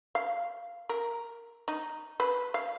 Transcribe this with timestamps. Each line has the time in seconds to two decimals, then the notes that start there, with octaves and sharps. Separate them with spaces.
0.15 F5
0.89 A#4
1.68 D#4
2.20 B4
2.54 F5